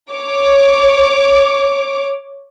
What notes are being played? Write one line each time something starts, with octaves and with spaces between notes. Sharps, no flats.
C#5 D6